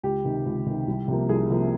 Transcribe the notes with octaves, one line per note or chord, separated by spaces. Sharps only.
C#2 G4
C3 D#3
C#2
C3 D#3
C2
C3 F3 A#3
C2 G#4
C3 F3 A#3